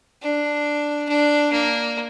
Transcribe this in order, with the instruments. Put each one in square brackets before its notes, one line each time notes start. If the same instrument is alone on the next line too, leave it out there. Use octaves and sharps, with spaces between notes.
[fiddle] D4
D4
A#3